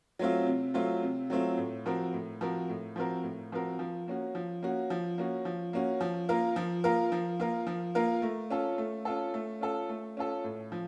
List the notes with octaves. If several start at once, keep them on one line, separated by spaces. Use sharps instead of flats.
F#3 A3 C4 F4
C3
F#3 A3 C4 F4
C3
F#3 A3 C4 F4
A2
F3 C4 F#4 A#4
A2
F3 C4 F#4 A#4
A2
F3 C4 F#4 A#4
A2
F3 C4 F#4 A#4
F3
A#3 C#4 F#4
F3
A#3 C#4 F#4
F3
A#3 C#4 F#4
F3
A#3 C#4 F#4
F3
A#3 F4 A#4
F3
A#3 F4 A#4
F3
A#3 F4 A#4
F3
A#3 F4 A#4
A3
C#4 F4 A4
A3
C#4 F4 A4
A3
C#4 F4 A4
A3
C#4 F4 A4
A2
F3